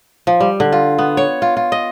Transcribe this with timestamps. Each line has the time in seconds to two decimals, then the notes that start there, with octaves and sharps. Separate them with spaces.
0.27 F3
0.41 G3
0.60 D3
0.72 F4
0.99 B3
1.17 C#5
1.42 F4
1.57 F4
1.72 D#5